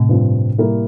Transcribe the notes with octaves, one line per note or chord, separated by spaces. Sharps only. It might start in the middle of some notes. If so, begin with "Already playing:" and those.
Already playing: A2 C3
G2 F3 C4
G3 A#3 E4 A#4